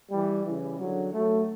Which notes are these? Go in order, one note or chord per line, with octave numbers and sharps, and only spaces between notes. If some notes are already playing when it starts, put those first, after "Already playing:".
E3 G3
C#3 E3
D3 F#3
F#3 A3